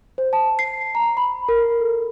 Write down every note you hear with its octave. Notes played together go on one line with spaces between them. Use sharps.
C5
A5
C7
A#5
B5
A#4
A4